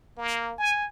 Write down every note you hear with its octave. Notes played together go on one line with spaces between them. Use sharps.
A#3
G#5